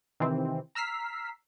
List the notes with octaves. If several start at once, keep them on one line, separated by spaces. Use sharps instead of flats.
C3 D#3 E3 C4
A#5 E6 F6 B6 C7